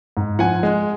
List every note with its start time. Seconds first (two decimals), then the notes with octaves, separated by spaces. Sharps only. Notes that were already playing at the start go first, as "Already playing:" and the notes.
0.17 G#2
0.39 F3 F#5 G#5
0.63 G#3